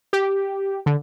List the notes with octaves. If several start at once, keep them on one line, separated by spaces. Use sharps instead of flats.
G4
D3